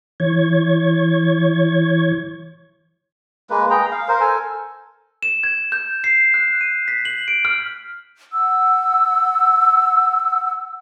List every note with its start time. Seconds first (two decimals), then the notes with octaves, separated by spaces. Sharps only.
0.20 E3 C#5 G#6
3.50 G#3 A#3 B4
3.70 G#4 G5 A#5
3.91 F5
4.08 A#4 C5
4.20 A4 G#5
5.23 E7
5.43 G#6
5.72 G6
6.04 C7
6.34 F#6
6.61 D#7
6.88 B6
7.05 F#7
7.28 D7
7.45 F6
8.32 F#5 E6